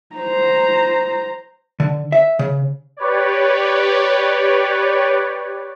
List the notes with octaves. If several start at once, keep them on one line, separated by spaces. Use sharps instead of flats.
C5 A#5
D3
E5
C#3
G4 B4 C#5 D5